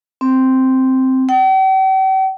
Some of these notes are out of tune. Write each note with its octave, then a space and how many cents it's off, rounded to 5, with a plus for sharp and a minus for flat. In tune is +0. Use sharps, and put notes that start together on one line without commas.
C4 +0
G5 -45